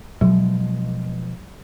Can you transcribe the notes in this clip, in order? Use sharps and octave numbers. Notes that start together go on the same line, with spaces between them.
B2 F3 F#3 G#3